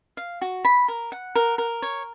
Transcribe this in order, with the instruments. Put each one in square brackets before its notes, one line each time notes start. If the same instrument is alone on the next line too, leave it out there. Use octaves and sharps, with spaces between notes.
[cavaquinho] F5
F#4
B5
A#4
F#5
A#4
A#4
C#5